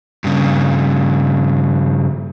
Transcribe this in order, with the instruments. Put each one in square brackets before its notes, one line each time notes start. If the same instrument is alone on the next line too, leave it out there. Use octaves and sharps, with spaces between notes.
[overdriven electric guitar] G2 C#3